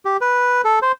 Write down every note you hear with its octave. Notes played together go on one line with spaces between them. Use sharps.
G4
B4
A4
C5